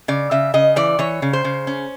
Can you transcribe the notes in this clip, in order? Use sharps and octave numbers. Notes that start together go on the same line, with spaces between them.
C#3 D5
C#3 E5
C#3 D#5
E3 D5
E3 C#5
C#3
C5
C#3
C#4